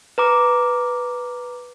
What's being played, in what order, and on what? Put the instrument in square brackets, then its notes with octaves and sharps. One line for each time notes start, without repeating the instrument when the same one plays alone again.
[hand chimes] B4 A#5 D6